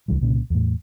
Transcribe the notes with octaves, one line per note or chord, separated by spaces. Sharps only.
C#2 D3 E3 G3
C2 A#2 C#3
E2 A2